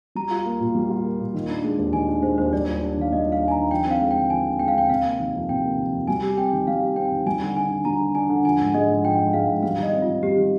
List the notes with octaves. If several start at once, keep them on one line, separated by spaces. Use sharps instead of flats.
G3 A#5
F4
A#3
A#2
G3
F4
A#3
A#2
D#3
D4
G#3
D#2
D#3 G#5
D4
G#3 C5
D#2 C5
G3 D5
F4
D4
D#3 F5
G3 D#5
F4
F5
D4
G#5
A#5
D#3
F3 G5
C4
F5
G#3
G5
D3
F3 G#5
C4
G#3 G5
F5
D3 G5
C3 F5
A#3
D#3
F2
C3 G5
A#3
D#3
F2
G3 G#5
G4
C4 G5
D#3
G3 F5
G4
C4 G5
D#3
G3 G#5
D3
D4 G#5
D3
G3 A#5
D3
D4 G#5
D3
F3 G#5
G#2
G#3 D#5
G#2
F3 G5
G#2
G#3 F5
G#2
G3 F5
D#3 D#5
C4
F4
D#3
G3 G4
D#3